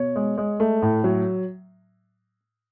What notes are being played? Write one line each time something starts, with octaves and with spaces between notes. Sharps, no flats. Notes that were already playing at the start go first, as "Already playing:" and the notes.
Already playing: B2 C#5
G#3
G#3
A3
A2
F#3